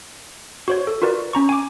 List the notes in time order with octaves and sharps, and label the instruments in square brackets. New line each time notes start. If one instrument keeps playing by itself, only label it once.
[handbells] F#4 C5 C#5
A4
F4 F#4 A#4 B4 D5
C#4 A#5 C#6
G#5 D6